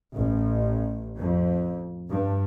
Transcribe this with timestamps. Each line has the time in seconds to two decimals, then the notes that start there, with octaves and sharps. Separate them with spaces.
0.13 A1
1.17 F2
2.09 G2